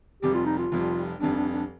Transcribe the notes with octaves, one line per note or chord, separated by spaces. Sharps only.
F1 F2 C3 G3 G4
F4
D#4
F4
F1 F2 C3 G3
F1 F2 C3 G3 D4
D4
D4